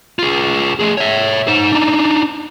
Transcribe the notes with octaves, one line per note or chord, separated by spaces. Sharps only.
F4 G#4
A3 G#4
C#5 E5
D#4 C5
D4 D#4